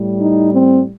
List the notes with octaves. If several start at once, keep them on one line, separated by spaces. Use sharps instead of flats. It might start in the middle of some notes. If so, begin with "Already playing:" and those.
Already playing: A2 G3
D#4
C4